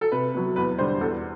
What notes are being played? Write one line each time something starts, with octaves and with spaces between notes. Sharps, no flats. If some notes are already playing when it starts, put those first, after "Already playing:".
A4
C3 B4
F#3 B3
E2 B4
D3 G3 C5
E2 A4